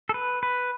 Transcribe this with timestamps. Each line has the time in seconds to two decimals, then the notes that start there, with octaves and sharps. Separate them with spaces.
0.09 A4
0.14 B4
0.43 B4